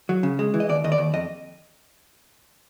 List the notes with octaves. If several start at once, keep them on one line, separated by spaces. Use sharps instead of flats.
F#3
C#3
G#3
E3
D#5
D#2 D5
D#2 D#5
D5
D#2
F2 D#5